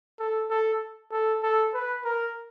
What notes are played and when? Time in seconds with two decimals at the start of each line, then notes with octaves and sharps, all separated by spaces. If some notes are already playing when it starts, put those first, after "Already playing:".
0.19 A4
0.50 A4
1.12 A4
1.43 A4
1.74 B4
2.05 A#4